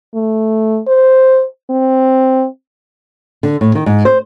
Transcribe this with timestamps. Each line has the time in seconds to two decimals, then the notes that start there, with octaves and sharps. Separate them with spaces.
0.15 A3
0.87 C5
1.70 C4
3.43 D3
3.61 A2
3.75 D#3
3.86 G#2
4.05 C5